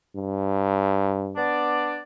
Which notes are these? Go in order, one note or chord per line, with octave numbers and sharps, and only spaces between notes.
G2
B3 D4 D5